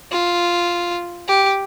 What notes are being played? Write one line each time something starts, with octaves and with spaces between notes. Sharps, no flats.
F4
G4